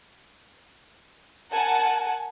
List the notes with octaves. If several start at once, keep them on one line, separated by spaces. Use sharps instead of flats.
A#4 F#5 G#5 A5